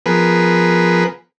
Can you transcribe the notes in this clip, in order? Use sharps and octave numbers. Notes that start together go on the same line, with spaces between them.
F3 B3 G#4 A#4 B4